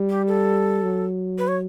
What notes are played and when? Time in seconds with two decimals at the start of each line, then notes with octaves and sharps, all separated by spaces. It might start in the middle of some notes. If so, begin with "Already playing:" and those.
Already playing: G3
0.09 G4
0.28 A4
0.83 F#3
1.38 B4
1.48 C#5